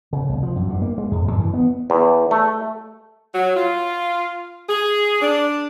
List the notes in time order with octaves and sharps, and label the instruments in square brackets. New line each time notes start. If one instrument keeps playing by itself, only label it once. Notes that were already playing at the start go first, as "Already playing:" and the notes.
[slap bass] C#3
C2
F3
F#2
G2
A#3
G#3
F2
F#2
E3
B3
[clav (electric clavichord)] E2
A3
[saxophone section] F#3
F4
G#4
D4